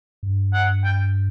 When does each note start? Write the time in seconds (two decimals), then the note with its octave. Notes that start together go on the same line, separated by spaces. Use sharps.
0.23 G2
0.53 F#5
0.84 G5